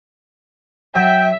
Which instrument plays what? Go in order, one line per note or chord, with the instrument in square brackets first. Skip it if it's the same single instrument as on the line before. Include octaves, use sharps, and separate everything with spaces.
[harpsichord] F#3 [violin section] E5 [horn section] G5